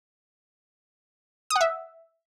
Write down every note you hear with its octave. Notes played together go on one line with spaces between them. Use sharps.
D#6
F#5
E5